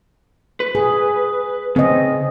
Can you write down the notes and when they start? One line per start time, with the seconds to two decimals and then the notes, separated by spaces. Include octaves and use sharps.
0.60 B4
0.75 G#4
1.76 C#3 C4 D#5